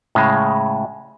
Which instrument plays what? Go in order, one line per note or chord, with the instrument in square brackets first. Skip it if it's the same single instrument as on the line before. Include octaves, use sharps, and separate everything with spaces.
[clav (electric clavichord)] A2 C#3 G#3